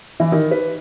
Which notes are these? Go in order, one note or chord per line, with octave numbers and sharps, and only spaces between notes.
E3
D#3
B4